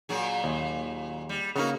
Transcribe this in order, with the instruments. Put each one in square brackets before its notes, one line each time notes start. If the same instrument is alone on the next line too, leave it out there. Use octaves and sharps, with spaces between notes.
[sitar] A#2 F#3 G#4
[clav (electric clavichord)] D#2
[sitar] G3
[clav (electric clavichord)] C#3 A#3 [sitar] B3 D#4 F#4